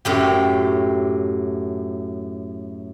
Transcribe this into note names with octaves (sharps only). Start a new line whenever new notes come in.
F#2 A2 G4